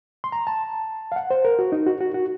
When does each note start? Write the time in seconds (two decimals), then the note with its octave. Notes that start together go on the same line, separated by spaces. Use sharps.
0.24 C6
0.32 A#5
0.47 A5
1.12 F5
1.16 F#5
1.30 C5
1.45 A#4
1.59 F#4
1.72 D#4
1.87 F#4
2.01 F#4
2.14 F#4